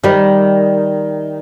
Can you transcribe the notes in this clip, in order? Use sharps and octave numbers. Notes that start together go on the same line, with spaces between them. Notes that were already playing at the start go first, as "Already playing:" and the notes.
D#3 G3